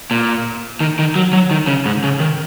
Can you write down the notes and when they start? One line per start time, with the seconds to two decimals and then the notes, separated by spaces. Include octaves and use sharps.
0.11 A#2
0.80 D#3
0.99 D#3
1.16 F#3
1.33 F#3
1.51 D#3
1.67 C#3
1.85 G#2
2.03 C#3
2.20 D#3